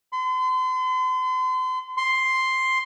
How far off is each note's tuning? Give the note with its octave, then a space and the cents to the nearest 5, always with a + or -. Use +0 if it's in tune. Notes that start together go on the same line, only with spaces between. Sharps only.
C6 -40
C6 +5